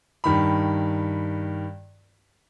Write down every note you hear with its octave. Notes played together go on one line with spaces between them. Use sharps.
G2 D#3 B5